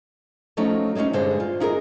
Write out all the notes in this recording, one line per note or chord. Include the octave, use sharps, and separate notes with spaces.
F3 F#3 A3 C#4 D#4
G3 G#3 C4 C#4 D#4
G2 D3 G#3 C5
F4
D#4 E4 G#4 A#4